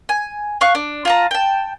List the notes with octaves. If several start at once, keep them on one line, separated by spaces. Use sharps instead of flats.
G#5
F5 C#6 F#6
D4
F4 A5 A#5
G5 A5